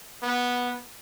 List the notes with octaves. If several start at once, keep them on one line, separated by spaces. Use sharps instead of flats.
B3